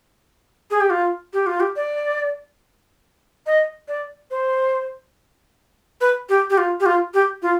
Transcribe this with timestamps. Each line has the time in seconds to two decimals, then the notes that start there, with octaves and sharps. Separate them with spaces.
0.71 G#4
0.81 G4
0.90 F4
1.33 G4
1.47 F4
1.60 G4
1.76 D5
3.46 D#5
3.88 D5
4.31 C5
6.01 B4
6.29 G4
6.50 G4
6.58 F4
6.80 G4
6.86 F4
7.14 G4
7.42 F4